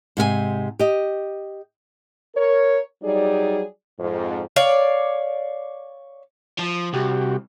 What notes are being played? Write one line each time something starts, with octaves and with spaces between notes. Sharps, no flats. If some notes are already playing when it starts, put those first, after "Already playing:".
G#2 C3 A4 G#5
G4 D#5
A#4 C#5
F#3 G3 D#4 G#4 D5
F2 G#2
C#5 D5 F5
F3
C2 F#4 G4